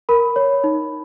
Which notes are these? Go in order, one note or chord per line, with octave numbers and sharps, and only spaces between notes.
A#4 B5
C#5
D#4